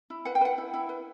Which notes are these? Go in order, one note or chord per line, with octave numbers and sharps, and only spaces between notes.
E4
B4 F#5
G5
B4 F#5
E4
E4
B4